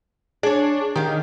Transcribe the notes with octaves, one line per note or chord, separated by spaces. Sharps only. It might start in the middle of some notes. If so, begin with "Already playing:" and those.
D4 G#4 C#5
D#3 G4 F5